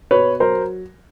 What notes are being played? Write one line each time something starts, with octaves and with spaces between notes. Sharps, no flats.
B2 B4 C#5
F#3 A#4 C5